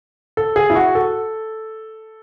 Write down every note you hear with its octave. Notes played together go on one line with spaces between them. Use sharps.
A4
G#4
E4
F#4
A4